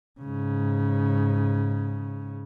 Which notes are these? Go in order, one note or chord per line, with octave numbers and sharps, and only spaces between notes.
G#2 C#3